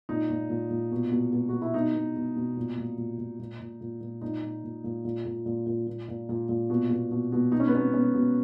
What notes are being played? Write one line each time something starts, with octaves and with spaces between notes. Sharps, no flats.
A#2 D#4
A#2
A#2
A#2
B2
B2
B2
B2 F#4
E4
B2 D#4
B2
B2
B2
A#2
A#2
A#2
A#2
A#2
A#2
A#2
A#2
A#2 D#4
A#2
A#2
A#2
A#2
A#2
A#2
A#2
A#2
A#2
A#2
A#2
B2
B2
B2
B2
B2 D#4
C#4
B3
B2 C#4
B2 C#4
B2